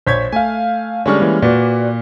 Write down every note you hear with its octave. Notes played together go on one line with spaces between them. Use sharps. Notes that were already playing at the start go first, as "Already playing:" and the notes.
A#1 C5 C#5 G6 G#6 B6
A3 F5 G#5
D3 G3 G#3 C#4 C#6 F6
E3 A#3
A#2 F#4 B4 D5